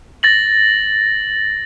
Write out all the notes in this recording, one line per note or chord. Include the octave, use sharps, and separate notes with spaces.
A6 A#6 F#7